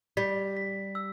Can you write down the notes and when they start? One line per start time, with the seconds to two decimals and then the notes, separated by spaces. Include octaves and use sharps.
0.17 G3 B6
0.57 B6
0.95 E6